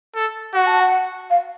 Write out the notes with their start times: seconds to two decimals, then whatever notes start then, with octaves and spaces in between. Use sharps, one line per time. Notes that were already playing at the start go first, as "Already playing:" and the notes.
0.15 A4
0.54 F#4 F#5
0.66 A5
0.80 F#5
1.30 F5